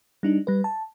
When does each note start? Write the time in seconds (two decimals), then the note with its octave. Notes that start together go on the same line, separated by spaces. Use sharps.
0.23 G3 D4 D#4
0.47 G3 B4
0.64 A5